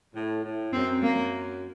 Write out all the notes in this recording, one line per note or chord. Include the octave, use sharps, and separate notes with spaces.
A2
A2
F#2 C4
A#3